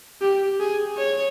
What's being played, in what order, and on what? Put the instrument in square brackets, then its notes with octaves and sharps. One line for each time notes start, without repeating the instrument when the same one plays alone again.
[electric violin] G4
G#4
C#5